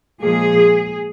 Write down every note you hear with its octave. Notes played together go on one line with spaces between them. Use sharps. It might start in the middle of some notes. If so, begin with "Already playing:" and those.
A#2 F3 G#3 G#4